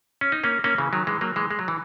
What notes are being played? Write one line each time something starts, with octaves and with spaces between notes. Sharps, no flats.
C#4
D#4
A#3 C#4
A#3 C#4
C#3 E3
D#3 F#3
E3 G#3
F#3 A#3
E3 G#3
G#3
F#3
E3